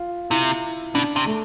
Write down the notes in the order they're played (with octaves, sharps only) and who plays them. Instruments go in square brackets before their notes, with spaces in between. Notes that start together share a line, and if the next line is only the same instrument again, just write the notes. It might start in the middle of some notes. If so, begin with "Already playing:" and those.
Already playing: [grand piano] F4
[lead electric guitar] C3 [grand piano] E4
[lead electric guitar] B2 [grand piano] D4
[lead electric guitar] C3
[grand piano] A3